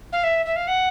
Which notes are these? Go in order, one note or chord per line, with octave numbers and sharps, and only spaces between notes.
F5
E5
E5
F5
F#5